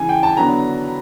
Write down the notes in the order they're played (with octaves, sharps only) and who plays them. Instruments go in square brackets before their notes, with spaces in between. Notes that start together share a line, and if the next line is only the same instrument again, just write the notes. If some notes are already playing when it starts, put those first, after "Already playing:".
Already playing: [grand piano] C#3 E3 G#5
G5
A5
D3 F#3 B3 D4 A#5